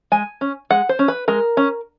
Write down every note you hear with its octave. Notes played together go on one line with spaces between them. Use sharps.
G#3 G#5
C#4
G#3 F#5
C5
C#4
B4
G#3 A#4
C#4